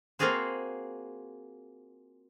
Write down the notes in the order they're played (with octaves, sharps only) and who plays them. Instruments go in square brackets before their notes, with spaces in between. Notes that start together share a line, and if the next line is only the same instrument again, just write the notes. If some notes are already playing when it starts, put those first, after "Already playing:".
[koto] A#3 C4 F4 F#4 G#4 C5